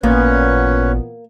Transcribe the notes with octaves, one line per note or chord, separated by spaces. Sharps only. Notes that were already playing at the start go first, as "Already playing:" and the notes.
A1 A#2 E3 A#3 B3 C#4 B4 C#5